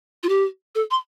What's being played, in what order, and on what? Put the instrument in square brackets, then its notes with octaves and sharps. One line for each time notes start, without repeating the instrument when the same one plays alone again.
[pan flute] F4
G4
A4
C6